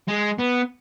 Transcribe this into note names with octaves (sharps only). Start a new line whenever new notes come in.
G#3
B3